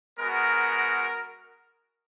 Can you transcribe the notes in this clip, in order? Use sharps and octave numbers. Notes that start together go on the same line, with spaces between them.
G#3 B3 F#4 A#4